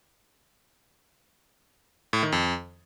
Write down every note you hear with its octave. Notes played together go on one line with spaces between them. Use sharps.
A2
D#3
F2